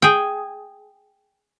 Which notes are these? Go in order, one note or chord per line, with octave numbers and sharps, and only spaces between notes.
G#4 G5